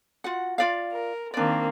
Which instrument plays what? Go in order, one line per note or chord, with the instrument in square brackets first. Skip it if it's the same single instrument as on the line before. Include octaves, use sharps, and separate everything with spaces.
[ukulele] F4 F#4 F#5
F4 D5 F5
[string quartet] A#4
[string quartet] D#3 A#3 C4 [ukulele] D4 D5